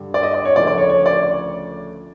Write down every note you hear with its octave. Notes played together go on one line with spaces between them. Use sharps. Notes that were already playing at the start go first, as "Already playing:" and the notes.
Already playing: G2 D3 G3
D5
D#5
D5
C#5
D2 C#3 F3 A3 D5
D5
C#5
C#5
D5